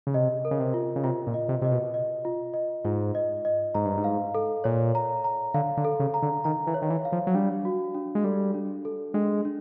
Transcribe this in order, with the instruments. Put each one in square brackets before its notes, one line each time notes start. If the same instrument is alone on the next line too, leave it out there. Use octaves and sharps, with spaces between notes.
[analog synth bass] C#3
[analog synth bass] C3 [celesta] D#5
[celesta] A#4
[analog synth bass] C#3
C3
[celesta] F4
[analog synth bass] C#3
[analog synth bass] C3 [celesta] F4
[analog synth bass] A#2
[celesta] D#5
[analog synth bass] C3
[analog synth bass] C3 [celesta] D#5
[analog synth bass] B2
[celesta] D#5
F4
D#5
[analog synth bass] G#2 [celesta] F4
[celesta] D#5
D#5
[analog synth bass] G#2 [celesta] A#5
[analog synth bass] G2
G#2
[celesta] F5
A4
[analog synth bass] A#2 [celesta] C#5
[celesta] A#5
A#5
[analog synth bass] D3 [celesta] F5
[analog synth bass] D3
[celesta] A4
[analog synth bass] C#3
[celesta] A#5
[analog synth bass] D3
[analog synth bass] D#3 [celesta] A#5
[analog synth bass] E3
[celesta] C#5
[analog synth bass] D#3
E3
[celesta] F5
[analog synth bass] F3
F#3
[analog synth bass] G3 [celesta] D4
[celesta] F#4
D4
[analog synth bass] G#3
[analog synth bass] G3 [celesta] A4
[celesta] D4
A4
[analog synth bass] G#3 [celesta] D4
[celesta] D4